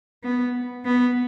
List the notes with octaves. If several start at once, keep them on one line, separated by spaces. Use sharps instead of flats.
B3
B3